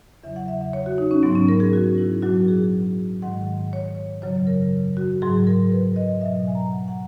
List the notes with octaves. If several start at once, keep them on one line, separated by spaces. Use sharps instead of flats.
E2 C#3 F#3 E5
F#5
E5
E5
C#5
F#4
D#4
C#4
G#2 F#3 B3
C#4
A#4
G#4
F#4
E4
A#2 F#3 F#4
G#4
G#2 D#3 G#3 F#5
C#5
F#2 C#3 F#3 C#5
A#4
F#4
G#2 F#3 G#4
A#4
B4
D#5
B2 F#3 E5
G#5
A#5
F#5
F#5